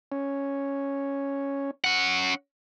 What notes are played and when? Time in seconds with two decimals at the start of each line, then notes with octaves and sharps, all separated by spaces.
0.12 C#4
1.84 C#4 F#5